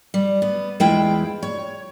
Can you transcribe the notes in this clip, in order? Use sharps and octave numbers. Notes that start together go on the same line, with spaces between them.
G3
B3
E2 G#3 E4 F4 G5
C#5